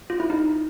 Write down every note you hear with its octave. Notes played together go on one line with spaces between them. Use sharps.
F4
E4
D#4